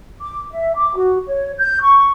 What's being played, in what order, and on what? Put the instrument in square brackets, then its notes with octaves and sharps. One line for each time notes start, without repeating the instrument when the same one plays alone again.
[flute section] D6
E5
D6
F#4
C#5
G6
C#6